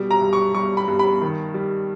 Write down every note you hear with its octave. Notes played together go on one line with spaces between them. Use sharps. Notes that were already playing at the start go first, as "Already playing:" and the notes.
Already playing: B2 G3
A#5
G2
C#6
G3 C#6
B5
G2
B5
D#3
G3